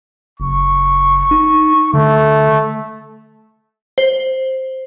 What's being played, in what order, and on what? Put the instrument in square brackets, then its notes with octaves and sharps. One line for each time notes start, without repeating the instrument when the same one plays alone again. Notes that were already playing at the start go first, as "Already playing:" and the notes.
[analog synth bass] F#1 [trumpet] C#6
[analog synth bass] D#4
[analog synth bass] D3 [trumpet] A3
[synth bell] C5